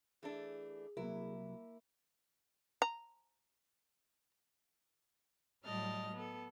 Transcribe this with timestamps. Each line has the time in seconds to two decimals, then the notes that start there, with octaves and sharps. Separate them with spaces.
0.23 E3 A3 D4 G#4
0.97 C2 F#3 A#3 E4 A#4
2.82 A#5
5.65 A2 F#3 G3 D#5 A5 F6
6.14 B3 A4